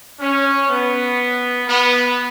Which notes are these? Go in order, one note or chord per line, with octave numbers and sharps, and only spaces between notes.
C#4
B3
B3